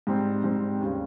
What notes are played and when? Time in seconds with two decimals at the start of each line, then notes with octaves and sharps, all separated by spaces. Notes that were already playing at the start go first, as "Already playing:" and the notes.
0.07 G#2 G3 C4
0.44 G#2 G3 C4
0.81 D#2 C#3 G3